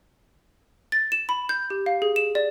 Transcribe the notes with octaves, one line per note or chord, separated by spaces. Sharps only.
A6
E7
B5
G6
G4
F5
G#4
E7
D5